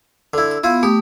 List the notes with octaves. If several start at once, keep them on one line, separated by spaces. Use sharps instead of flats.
D3 E4
E6
B3 E4 F4
A3 G4 D#6